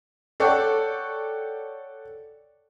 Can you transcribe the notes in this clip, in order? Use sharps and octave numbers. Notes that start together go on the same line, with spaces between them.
A4 C#5 D5 F#5 G5